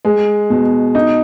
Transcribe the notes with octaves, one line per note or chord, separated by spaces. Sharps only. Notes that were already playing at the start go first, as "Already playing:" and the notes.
G#3
B2
D#4